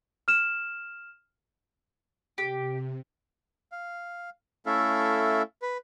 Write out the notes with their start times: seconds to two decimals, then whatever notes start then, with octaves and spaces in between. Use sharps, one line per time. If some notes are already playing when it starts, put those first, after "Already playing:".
0.28 F6 E7
2.38 C3 G4
3.72 F5
4.66 A3 C#4 E4 A4 E5 F5
5.62 B4